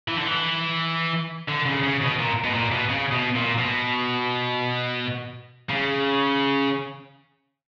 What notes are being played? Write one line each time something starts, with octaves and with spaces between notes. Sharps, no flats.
E3
D3
E3
D3
C#3
C#3
B2
A#2
B2
A#2
B2
C#3
B2
A#2
B2
C#3